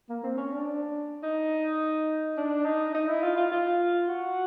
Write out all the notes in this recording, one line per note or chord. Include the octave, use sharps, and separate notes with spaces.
A#3
C4
C#4
D4
D#4
D4
D#4
D#4
E4
F4
F4
F4
F#4